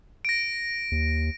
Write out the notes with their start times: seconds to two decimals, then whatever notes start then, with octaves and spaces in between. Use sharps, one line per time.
0.25 A#6 D7
0.92 D#2